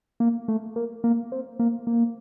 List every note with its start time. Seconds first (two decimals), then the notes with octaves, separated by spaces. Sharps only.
0.20 A#3
0.48 A3
0.76 A#3
1.04 A#3
1.32 C4
1.59 A#3
1.87 A#3